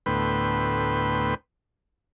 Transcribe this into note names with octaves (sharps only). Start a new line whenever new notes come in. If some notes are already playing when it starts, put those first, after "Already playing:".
D2 A2 B3 B4 G5 C6